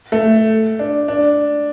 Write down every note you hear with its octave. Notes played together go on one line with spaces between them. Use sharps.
A3
D4
D4